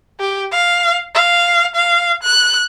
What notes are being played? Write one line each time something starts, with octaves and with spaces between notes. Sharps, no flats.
G4
F5
F5
F5
F#6